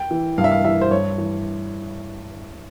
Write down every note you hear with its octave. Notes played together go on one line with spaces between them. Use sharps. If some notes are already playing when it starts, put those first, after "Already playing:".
Already playing: G5
E3
G2 F5
E5
F5
E3 E5
C5
G2 C#5
E3